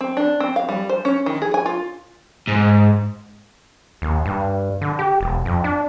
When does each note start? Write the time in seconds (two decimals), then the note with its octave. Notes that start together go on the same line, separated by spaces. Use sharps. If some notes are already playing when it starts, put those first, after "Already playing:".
0.01 C4
0.17 D4
0.40 C4
0.56 F5
0.69 G3
0.89 C5
1.05 C#4
1.26 D#3
1.42 G#4
1.54 G#5
1.66 F4
2.48 G#2
4.02 D#2
4.26 G2
4.81 D3
4.99 G4
5.21 E1
5.45 F2
5.64 D4